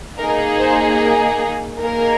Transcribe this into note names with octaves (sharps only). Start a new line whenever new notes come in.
A#3 D#4 G#4 A#4
C5
A#4
A#3 D#4 G#4 A#4